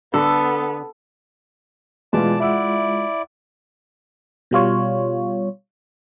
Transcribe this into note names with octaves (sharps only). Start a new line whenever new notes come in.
D3 B3 A4
B2 E3 G#3 F4 D5 A5
E4 D5 E5 F#5 E6
B2 G3 F4 C#5